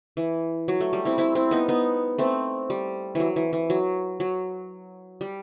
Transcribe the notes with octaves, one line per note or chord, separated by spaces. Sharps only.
E3
F#3
A3
G3
C4 E4
C4 E4
C4 E4
B3 D#4
B3 D#4
A3 C4
G3
E3 F#3
E3
E3
F#3
F#3
G3